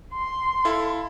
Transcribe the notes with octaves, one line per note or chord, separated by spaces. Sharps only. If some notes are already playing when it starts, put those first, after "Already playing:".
C6
E4 A4 F5